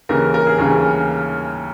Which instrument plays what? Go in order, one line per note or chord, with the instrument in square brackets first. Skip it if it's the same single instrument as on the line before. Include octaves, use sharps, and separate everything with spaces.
[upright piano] D#2 C#3 E3 A#4
A#4
G#4
D#2 C#3 E3 A#4